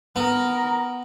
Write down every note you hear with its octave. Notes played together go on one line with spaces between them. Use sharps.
B3 A#4